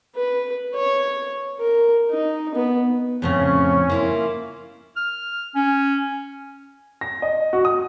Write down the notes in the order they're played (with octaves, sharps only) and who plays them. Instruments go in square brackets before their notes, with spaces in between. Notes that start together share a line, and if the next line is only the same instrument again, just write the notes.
[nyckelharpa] B4
C#5
A#4
D#4
B3
[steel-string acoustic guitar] F2 A2 C#3 [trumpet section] C#4
[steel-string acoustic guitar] A#3 E4 F4
[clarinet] F6
C#4
[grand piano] A#6
D#5
F#4
D#6